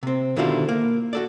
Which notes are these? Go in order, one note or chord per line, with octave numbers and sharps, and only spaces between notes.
C3 C4
B2 D3 D#3 E4 F4 G4
A#3
F#4 A4 D5